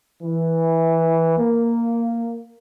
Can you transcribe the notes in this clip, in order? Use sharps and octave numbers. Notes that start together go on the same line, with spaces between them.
E3
A#3